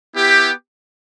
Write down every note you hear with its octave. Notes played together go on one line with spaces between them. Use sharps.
B3 E4 G4